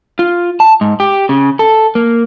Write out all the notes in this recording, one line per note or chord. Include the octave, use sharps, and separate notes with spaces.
F4
A5
G#2
G4
C#3
A4
A#3